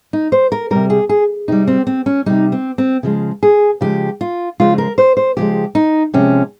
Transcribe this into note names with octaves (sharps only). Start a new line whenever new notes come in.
D#4
C5
A#4
C3 G3 A#4
G#4
G#4
C3 G3 D#4
C4
C4
C#4
C3 G3 D#4
C4
C4
C#3 F3 G#3
G#4
C#3 F3 G#3 G4
F4
C#3 F3 G#3 F4
A#4
C5
C5
C#3 F3 G#3 G4
D#4
C3 F3 G#3 C#4